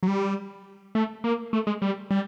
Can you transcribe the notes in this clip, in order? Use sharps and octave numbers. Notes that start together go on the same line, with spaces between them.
F#3
G3
A3
A#3
A3
G#3
G3
G3